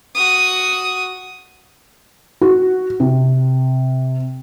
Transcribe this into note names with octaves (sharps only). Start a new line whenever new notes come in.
F#4 D#6
F#4
C3